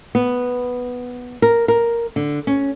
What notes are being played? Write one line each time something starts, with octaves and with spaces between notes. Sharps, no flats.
B3
A#4
A#4
D3
C#4